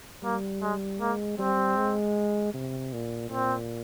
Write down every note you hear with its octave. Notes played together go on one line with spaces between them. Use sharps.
G3 A#3
G#3
G#3 A#3
G3 C4
G#3
C3
A#2
A#2 C4